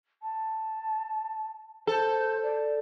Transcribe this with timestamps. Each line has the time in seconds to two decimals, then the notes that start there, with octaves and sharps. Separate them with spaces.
0.23 A5
1.87 A4 C5
2.43 D5